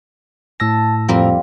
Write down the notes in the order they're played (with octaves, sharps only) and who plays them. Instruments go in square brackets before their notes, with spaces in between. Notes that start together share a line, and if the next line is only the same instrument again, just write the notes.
[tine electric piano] A2 E6 A#6 [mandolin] A5
[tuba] F2 [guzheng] G3 A#3 C4 [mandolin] A#4